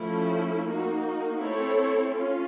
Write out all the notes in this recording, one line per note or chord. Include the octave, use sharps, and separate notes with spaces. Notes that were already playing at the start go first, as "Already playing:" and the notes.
Already playing: F3 A3 C#4 E4
A#3 D#4 F#4
A3 C4 E4 A4 C#5
C#4 F4